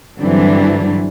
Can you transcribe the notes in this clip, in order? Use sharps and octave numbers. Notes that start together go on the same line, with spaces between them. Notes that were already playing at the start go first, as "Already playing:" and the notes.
G2 D3 E3 F#3 C4 D4